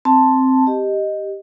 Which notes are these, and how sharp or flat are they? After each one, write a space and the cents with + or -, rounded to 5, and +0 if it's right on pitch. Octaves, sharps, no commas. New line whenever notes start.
C4 +0 A5 +0
G4 +0 D#5 +0